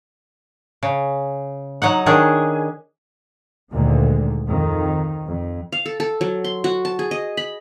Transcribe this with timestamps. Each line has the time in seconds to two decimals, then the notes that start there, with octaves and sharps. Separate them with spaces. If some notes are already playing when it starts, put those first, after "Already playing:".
0.83 C#3
1.82 F#3 D#4 F#5
2.06 D#3 C#4 D4 G#4
3.72 D2 A#2 D3 D#3 G#3
4.47 F2 D#3
5.28 F2
5.72 F5
5.86 A4
6.00 A4
6.21 F#3
6.44 C6
6.64 F#4
6.85 A5
6.99 G#4
7.11 D#5
7.37 B5